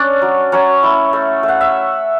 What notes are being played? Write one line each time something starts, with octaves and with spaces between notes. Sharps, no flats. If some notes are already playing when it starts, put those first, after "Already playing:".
Already playing: C#4 D4 D5
F#3
F#3 C#4 C#5
E4
A3
A3
F#5
E5